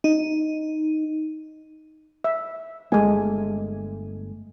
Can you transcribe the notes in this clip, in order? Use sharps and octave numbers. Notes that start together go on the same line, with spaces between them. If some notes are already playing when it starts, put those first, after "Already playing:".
D#4
E5
G1 G#3 A3 G#5